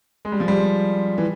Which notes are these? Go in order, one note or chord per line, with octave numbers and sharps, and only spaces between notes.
G#3
G3
F3
G3
E3